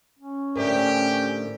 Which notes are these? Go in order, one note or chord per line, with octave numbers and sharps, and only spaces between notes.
C#4
A2 D3 A3 G4 A#4 C5 D5